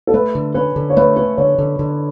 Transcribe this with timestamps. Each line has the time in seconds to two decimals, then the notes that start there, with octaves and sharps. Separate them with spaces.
0.07 A4
0.14 A3 B4
0.35 D3
0.54 C#4 B4
0.76 D3
0.90 C#5
0.97 A3 B4
1.16 C#4 B4
1.37 D3 C#5
1.58 D3
1.79 D3